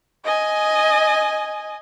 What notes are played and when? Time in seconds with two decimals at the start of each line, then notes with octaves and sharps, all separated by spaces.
0.24 D#5 G#5